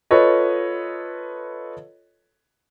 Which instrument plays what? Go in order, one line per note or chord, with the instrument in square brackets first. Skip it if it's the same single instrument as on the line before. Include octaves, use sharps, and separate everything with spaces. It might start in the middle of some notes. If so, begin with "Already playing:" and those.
[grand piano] F4 A4 B4 C#5 D#5